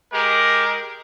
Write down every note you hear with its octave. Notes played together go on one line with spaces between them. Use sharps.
G#3 G4 A#4